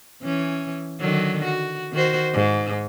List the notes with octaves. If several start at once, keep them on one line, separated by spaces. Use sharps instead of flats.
E3 C#4
D3 D#3 F#3
F#4
D#3 F#4 C5
G#2